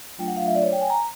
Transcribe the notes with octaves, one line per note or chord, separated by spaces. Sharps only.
F#3 A3 D4 F4 G5
F#5
F5
E5
D5
C#5
G5
G#5
A#5